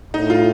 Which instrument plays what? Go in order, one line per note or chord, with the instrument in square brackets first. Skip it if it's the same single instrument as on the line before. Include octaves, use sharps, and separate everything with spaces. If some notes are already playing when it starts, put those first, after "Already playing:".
[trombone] A2 [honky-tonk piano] D#4
[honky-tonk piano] F4